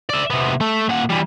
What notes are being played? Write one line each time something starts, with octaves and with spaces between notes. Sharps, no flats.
D5 E5
C3 B3
A3
A#2 F#5
E3 G3